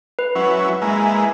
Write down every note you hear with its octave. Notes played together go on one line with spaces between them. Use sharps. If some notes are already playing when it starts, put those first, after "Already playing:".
B4
F#3 C#4 E4
G#3 A#3 E4